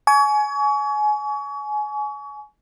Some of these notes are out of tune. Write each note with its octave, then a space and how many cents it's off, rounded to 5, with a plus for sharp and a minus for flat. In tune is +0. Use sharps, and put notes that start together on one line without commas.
G#5 +25 C#6 +35